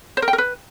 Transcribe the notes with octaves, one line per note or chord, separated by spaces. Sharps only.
C5
A#4
G5
A#4
B4